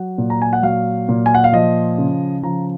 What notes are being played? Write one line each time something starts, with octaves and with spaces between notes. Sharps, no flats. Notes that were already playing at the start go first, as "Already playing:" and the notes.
Already playing: F#3 F#5
A#2
A#5
G#5
F#5
F#3 F5
A#2
G#5
F#5
F5
F3 D#5
C#3
F3 A#5